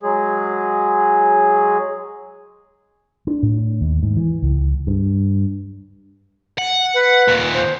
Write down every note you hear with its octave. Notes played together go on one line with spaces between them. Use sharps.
F#3 G#3 G#4
D4
A2
D#2
G#2
E3
C#2
G2
F#5
B4
D#2 A#2
C5